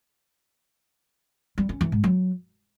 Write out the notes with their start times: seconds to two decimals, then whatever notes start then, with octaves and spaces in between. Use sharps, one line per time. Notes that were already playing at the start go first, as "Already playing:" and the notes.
1.58 G3
1.69 C#4
1.81 E3
1.92 G#2
2.04 F#3